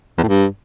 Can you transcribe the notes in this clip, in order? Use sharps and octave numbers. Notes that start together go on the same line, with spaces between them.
E2
A2
G2